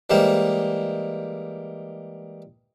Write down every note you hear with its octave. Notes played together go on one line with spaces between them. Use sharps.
E3 G3 G#3 A#3 C5